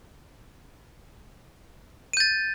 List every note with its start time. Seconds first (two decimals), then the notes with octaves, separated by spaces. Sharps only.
2.13 D#7
2.17 G6
2.20 A6